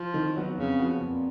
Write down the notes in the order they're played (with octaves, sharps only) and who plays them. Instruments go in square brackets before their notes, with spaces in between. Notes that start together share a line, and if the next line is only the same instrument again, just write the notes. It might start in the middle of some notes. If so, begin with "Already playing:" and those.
Already playing: [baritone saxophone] F3
[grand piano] D#3
F#3 B3 F#4
[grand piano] F2 [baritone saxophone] C#3
[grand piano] F3 B3 F#4
[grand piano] F2 [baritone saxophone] A#2